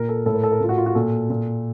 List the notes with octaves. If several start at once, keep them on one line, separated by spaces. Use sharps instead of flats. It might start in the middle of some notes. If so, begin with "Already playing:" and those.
Already playing: A#2 A#4
A4
A2 A4
A#4
A4
A#4
A2 F4
F#4
F4
F#4
A#2 A4
A#2